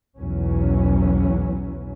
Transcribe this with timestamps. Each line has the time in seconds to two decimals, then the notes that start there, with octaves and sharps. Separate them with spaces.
0.18 B1 E2 E3 F#3 C#4